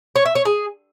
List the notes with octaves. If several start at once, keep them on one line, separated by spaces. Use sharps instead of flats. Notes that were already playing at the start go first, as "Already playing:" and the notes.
C#5
E5
C#5
G#4